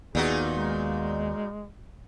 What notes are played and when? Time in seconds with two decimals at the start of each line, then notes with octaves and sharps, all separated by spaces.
0.15 D#2 A#2 B3 D#4 F#4 G#4
0.54 G#3